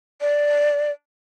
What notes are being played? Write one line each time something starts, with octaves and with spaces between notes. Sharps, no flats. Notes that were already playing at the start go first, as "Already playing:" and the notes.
D5